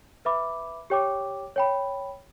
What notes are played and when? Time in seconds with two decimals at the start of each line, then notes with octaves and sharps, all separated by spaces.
0.25 B4 E5 B5 D6
0.90 G4 C#5 G5 D6
1.56 C#5 G5 B5